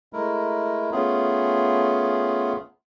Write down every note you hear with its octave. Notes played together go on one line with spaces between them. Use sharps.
G#3 A3 E4 A#4
A3 B3 C#4 F4 G#4